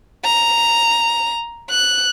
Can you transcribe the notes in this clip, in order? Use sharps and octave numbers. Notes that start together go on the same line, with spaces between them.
A#5
F#6